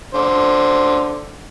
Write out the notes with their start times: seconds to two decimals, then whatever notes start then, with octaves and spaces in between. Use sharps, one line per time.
0.14 D3 C5